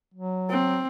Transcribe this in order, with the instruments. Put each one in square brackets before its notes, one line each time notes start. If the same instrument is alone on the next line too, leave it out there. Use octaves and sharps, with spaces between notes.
[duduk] F#3
[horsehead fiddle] C4